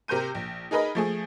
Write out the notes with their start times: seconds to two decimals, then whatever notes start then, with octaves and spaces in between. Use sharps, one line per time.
0.08 C3 A#4 C5 G6 D#7
0.35 A#1
0.71 D#4 G#4 A#4 B4 D#5 B5
0.95 F3 A3 G#4